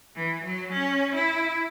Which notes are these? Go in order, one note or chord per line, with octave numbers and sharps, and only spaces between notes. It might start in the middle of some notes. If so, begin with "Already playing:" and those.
E3
F#3
C#4
E4